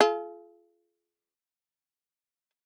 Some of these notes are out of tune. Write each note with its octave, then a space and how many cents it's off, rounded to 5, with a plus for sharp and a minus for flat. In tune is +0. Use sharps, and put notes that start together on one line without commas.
F4 -20 G#4 +45